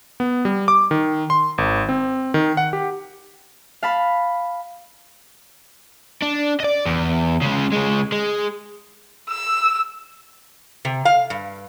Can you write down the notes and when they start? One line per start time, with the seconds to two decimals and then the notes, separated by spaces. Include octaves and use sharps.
0.20 B3
0.45 G3
0.68 D6
0.91 D#3
1.30 C6
1.58 G#1
1.89 C4
2.34 D#3
2.57 F#5
2.73 G4
3.83 F5 A5 B5
6.22 D4
6.60 D5 D#5
6.86 E2
7.42 C#3 G#3
7.73 C#3 G#3
8.12 G#3
9.30 E6
10.85 C3
11.05 F5
11.30 G2